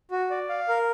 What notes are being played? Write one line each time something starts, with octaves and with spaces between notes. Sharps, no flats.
F#4
D5
F5
A#4